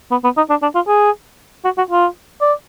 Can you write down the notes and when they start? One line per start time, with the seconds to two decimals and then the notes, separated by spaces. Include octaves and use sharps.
0.11 B3
0.24 B3
0.37 D#4
0.50 D4
0.62 D4
0.75 F4
0.87 G#4
1.65 F#4
1.78 F#4
1.91 F4
2.41 D5